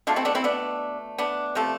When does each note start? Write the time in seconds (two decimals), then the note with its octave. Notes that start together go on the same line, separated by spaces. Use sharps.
0.07 B2 A3 D4 F4
0.16 C4 E4
0.25 B3 D4
0.35 C4 E4
0.44 B3 D4
1.18 B3 D4
1.55 C3 F3 A3